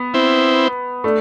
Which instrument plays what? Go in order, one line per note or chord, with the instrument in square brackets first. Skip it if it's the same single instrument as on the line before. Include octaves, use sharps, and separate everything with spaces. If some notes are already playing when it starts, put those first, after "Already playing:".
Already playing: [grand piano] B3
[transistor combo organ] C4 E4
[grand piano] A3 D4